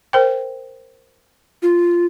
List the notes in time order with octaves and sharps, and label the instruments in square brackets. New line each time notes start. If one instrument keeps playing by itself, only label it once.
[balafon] A#4 C5 G5
[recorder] F4